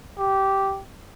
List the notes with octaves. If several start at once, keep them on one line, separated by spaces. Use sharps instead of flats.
G4